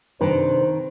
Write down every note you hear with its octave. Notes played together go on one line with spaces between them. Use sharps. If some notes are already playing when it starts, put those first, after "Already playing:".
C3 D#3 D4 B4 C5